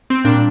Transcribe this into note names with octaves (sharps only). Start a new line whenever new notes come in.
C4
A#2 G3 D4